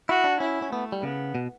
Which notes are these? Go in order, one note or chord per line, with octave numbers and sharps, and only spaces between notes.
E4 F#4
D4
C#4 E4
C#4
A3 B3
G3
C#3 B3
B2